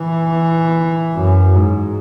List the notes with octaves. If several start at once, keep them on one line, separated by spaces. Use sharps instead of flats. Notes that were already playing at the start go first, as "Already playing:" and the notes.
Already playing: E3
F#2
G#2